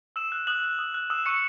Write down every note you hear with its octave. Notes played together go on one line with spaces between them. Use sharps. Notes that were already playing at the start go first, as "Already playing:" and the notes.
D#6 E6 E7
F#6
D#6 F#6 F#7
F#6
D#6
F#6
D#6 E6 E7
C#6 F#6 C#7